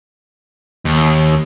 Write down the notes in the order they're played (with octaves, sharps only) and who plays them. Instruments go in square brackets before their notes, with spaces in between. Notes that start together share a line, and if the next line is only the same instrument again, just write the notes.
[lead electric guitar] D#2